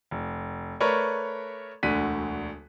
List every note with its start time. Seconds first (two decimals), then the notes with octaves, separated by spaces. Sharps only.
0.11 F1
0.80 A3 A#4 B4 C#5 D5
1.83 E1 D2 D3 F#6 B6 D#7